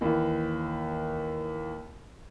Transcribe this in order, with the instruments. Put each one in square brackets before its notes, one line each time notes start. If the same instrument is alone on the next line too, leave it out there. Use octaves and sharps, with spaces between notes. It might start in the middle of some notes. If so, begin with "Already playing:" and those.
[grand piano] D#2 E3